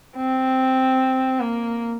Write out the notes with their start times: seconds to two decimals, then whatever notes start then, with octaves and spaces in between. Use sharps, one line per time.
0.16 C4
1.40 A#3